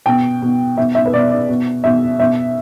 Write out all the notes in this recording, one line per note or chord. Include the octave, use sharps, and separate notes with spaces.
B2 G5
B2
B2 E5
E5
B4
B2 D5
D5
B2
B2 E5
B2 E5